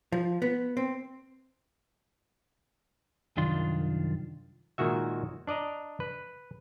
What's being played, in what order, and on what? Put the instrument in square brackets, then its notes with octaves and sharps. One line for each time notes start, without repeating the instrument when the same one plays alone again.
[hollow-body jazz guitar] F3
B3
C4
[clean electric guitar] C2 F#2 D#3 D4 F4 C6
[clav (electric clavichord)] A#2 D#3 G#3 F#4 E5
D4 D5 D#5 A#5
B4